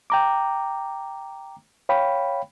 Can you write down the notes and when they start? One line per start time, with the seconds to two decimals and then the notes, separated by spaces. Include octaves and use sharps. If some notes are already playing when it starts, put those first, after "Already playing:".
0.10 G5 A#5 D6
1.89 C#5 F5 G5 B5